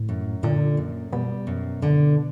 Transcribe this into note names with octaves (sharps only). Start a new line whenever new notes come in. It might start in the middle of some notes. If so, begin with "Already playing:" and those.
Already playing: A2
F#2
A#2 D3
F#2
B2 G3
F#2
D3